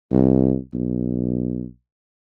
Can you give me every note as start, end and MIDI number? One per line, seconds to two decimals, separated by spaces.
0.12 0.57 36
0.74 1.65 35